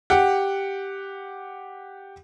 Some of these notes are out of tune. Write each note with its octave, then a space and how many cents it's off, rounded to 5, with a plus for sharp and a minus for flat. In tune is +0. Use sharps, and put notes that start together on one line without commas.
G4 +0 F#5 +0